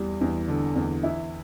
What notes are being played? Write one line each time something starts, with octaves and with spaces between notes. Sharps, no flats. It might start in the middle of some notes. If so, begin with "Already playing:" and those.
Already playing: E2 G3
E2
D3
E2
E3 E4